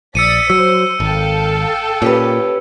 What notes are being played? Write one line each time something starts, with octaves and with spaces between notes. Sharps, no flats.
A#1 D5 D#6 E6 B6 C#7 D#7
F#3 C5 E6
G#1 A4 F5 G5
A#2 C#4 G4 B4